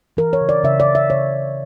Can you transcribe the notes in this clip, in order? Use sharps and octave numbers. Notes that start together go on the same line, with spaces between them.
E3 A#4
C#5
C#3
D5
C#3 E5
D5
C#3
E5
C#3 C#5